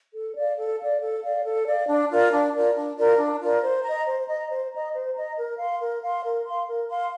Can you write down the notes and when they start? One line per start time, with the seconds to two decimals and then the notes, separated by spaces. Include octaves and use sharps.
0.14 A4
0.35 D5 F5
0.58 A4
0.79 D5 F5
1.01 A4
1.22 D5 F5
1.44 A4
1.66 D5 F5
1.87 D4
2.10 F4 A#4 D5
2.32 D4
2.52 F4 A#4 D5
2.75 D4
2.97 F4 A#4 D5
3.18 D4
3.40 F4 A#4 D5
3.61 C5
3.83 D#5 A#5
4.05 C5
4.27 D#5 A#5
4.49 C5
4.71 D#5 A#5
4.92 C5
5.14 D#5 A#5
5.36 A#4
5.57 F5 C6
5.79 A#4
6.01 F5 C6
6.23 A#4
6.44 F5 C6
6.66 A#4
6.88 F5 C6